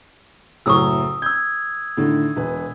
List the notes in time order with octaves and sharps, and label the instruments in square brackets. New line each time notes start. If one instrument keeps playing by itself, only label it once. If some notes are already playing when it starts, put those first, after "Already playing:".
[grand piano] F#1 A2 F#3 [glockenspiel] C#6 D#6 E6
[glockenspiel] E6 G#6 [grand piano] G6
[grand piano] A2 D3 D#3
E1 B4